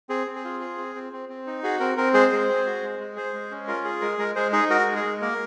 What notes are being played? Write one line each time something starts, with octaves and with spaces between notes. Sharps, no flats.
C4 G#4
C4
G#4
F4
G#4
C4
C4
C4
C4
D#4
F#4 G#4
C4 A#4
C4 A#4
G#3 G#4 C5
G#3
C4
F#4
G#3
G#3
G#4 C5
G#3
C#4
F4 A#4
G#4
G#3 A#4
G#3 A#4
G#3 G#4 C5
D#4 G#4
F#4 A#4
G#3
G#4
G#3
A#3 A#4